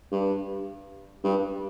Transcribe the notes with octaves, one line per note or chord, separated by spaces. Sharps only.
G2
G2